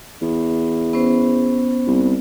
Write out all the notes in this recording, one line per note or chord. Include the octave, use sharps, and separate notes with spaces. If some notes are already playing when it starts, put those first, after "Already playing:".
E2
B3 C#4 C5
C2